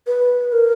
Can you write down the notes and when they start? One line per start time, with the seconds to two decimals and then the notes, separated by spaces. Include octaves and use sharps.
0.07 B4
0.52 A#4